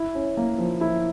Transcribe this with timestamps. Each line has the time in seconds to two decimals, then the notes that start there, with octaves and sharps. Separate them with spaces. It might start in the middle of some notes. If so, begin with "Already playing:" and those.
Already playing: E4
0.15 C#4
0.37 A#3
0.58 F3
0.81 E4